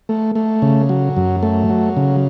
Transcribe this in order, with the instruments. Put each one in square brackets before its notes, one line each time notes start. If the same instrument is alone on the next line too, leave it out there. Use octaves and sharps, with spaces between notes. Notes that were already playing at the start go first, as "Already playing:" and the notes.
[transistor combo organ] A3
A3
C#3
F#3
F#2
A3
F#3
C#3